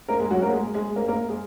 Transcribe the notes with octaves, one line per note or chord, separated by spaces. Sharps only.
A#3 A#4
G#3 G#4
F#3 F#4
A#3 A#4
G#3 G#4
G#3 G#4
A#3 A#4
A#3 A#4
G#3 G#4